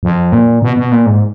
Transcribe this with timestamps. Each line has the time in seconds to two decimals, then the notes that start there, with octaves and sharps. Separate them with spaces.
0.03 F2
0.32 A#2
0.62 B2
0.77 B2
0.92 A#2
1.06 G#2